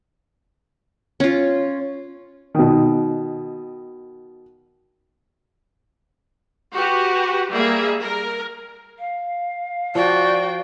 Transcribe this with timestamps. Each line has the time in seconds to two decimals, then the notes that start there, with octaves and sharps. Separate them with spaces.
1.20 C#4 F4
2.55 B2 D#3
6.75 F#4 G4 B4
7.51 G3 A#3 G#4 E5
8.01 A#4
8.99 F5
9.95 F3 F#4 D5 G5